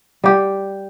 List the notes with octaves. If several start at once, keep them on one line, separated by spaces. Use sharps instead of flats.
G3 G4